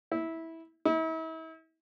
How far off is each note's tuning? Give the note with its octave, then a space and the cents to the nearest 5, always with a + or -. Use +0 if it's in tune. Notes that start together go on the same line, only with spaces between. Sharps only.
E4 -15
E4 -40